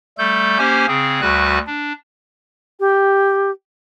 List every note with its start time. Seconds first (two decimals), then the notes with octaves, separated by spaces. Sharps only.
0.18 G3 A3 A4 G6
0.58 A#3 C#4 G4 C5 G#5
0.88 C#3 C4 G#4
1.21 D2 G3 F#4 B4 F#6
1.67 D4
2.80 G4